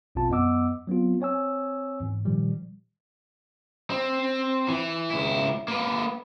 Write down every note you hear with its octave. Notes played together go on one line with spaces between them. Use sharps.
A#1 E2 B2 C4 F4 A5
F#2 B3 D#5 F#5 D6 E6
F#3 B3 C4 F4
C4 C#5 G#5 E6
E2 G#2 E3
A#2 D#3 F3 G3
C4
E3
C#2 E4
A#3 B4